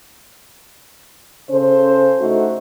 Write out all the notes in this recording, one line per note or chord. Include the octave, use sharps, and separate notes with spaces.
C#3 C#4 A4 C5
A3 D#4 F#4